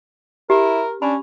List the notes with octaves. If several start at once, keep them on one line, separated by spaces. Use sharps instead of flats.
E4 G4 A#4
C#4 D4 B5